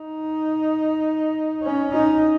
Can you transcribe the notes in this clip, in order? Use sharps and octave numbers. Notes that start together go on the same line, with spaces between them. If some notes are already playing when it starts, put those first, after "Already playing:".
Already playing: D#4
C#4
D#4